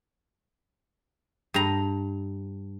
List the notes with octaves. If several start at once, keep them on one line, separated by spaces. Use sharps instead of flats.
G2 A#5